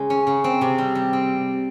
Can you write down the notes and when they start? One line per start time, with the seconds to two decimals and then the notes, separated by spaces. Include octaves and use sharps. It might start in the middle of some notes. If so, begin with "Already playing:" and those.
Already playing: C#3 G#3
0.10 C#4
0.27 C#3
0.44 C4
0.61 C3
0.78 G3
0.95 G3
1.13 C4